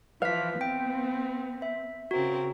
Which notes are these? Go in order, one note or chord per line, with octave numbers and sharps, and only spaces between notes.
E3 F3 B4 F5 B6
B3 C4 G5
E5
C#3 C4 F#4 A#4